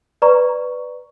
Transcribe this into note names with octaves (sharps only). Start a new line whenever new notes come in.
B4 D5 A#5 C#6